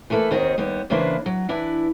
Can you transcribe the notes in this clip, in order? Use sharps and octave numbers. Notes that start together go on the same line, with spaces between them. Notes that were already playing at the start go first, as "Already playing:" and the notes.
E3 A3 A#3 A4 B4
D#2 D#3 C4 F#4 D#5
D#2 G3 B3
C#3 E3 A#3 D4 B4 C5
F#3
E3 D4 E4 B4